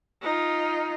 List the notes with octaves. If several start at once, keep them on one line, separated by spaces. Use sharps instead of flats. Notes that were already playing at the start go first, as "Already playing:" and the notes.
D#4 F4